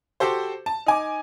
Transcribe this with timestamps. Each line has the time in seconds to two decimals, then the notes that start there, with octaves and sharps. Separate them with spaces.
0.20 F#4 G4 A4 C5
0.66 A5
0.86 D#4 G#5 D6